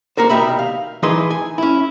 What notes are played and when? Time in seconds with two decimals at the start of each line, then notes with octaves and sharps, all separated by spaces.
0.17 A#3 F#4 A#4 C5
0.29 C2 B2 D#3 G4 E5 B5
0.59 F5
1.03 E3 D#4 E4 G#4 B4 C6
1.30 G#5
1.58 C#4 E4